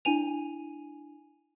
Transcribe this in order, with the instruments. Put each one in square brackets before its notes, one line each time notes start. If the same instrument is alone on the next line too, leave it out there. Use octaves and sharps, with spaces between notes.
[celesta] D4 E4 G#5 D#7 F7